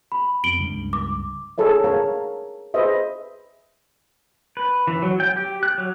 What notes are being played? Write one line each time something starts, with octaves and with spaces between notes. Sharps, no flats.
B5
F2 D7 F#7 G7
C#2 G2
D6
G#4 A4 C#5 E5
G#4 A#4 C#5 F5 A5 A#5
G#4 B4 C5 D#5 E5
B4
E3
F#3
G5
G4
F#6
F#3